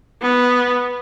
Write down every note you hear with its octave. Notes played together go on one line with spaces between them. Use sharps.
B3